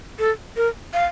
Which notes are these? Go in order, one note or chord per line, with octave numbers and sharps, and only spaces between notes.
A4
A#4
F5